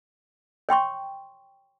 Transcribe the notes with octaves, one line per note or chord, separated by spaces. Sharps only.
C#5 G5 C6 C#6